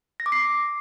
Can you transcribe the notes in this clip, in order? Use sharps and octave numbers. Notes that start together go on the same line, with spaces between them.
A#6
D6
C7